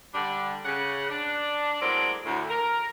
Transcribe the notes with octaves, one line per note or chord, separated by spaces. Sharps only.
D3 G3 D4
C#3 F#5
D4
A2 F#3 G#3 C4 A#4 D5
D2 A2
A#4